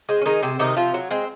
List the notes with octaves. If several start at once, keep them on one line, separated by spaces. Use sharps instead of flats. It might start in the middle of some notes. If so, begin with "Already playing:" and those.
G#3 C4
C#4
D#3 G#3 D#4
C3 C4
C3 D#3 D#4
C3 F3 F4
F#3
G#3 C4